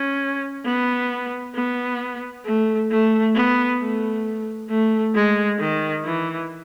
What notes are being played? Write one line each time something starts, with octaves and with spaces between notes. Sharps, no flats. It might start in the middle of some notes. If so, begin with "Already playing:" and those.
Already playing: C#4
B3
B3
A3
A3
B3
A3
A3
G#3
D#3
E3